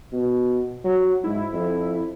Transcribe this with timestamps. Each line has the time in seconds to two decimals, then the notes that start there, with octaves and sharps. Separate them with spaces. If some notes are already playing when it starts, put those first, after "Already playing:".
0.12 B2
0.84 F#3
1.24 G#2 E4
1.53 F2